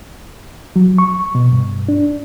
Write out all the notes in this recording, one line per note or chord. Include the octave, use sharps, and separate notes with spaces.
F#3
C#6
B2
G2
D4